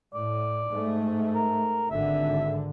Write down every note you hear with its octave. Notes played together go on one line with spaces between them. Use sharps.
A2 D5
G#2 A3
A#4
G#1 D3 E5